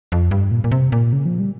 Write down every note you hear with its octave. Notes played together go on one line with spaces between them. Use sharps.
F2
G2
A#2
A#2
C3
A#2
C#3
F3
G3